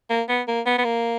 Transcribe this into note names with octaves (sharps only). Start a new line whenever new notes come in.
A#3
B3
A#3
B3
B3
A#3